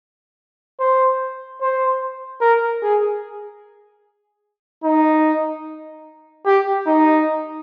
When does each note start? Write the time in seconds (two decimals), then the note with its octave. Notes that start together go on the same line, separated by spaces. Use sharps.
0.80 C5
1.61 C5
2.41 A#4
2.82 G#4
4.84 D#4
6.46 G4
6.87 D#4